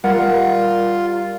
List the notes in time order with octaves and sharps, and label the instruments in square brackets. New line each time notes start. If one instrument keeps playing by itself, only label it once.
[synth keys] G3 A#4 [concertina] F4 [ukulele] F#5